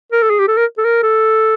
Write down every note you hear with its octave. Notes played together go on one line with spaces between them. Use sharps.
A#4
A4
G#4
G4
A4
A#4
A4
A#4
A4